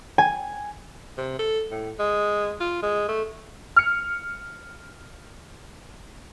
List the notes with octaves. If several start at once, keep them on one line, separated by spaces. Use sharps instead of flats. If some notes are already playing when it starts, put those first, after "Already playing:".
G#5
C3
A4
A2
G#3
F4
G#3
A3
F6 C#7